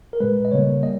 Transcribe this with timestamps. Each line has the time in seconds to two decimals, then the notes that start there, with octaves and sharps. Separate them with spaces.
0.13 A#4
0.20 A#2 G#3 B4
0.45 D#5
0.51 C#3 G3 A#3 C#5
0.83 G3 A#3 D#5